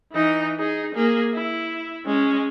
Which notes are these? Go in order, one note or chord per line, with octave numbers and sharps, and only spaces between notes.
E3 D#4
D#4 G#4
A#3 G#4
E4
G#3 C#4